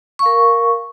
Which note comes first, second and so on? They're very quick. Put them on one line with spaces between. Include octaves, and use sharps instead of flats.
C#6 F5 A#4